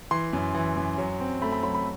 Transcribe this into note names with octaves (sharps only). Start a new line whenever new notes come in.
E3 C6
F#2
E3
F#2
F#3
C4
A3 B5
B5
F#3 B5
B5